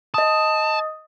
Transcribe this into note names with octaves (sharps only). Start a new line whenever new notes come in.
D#5 A5 D#6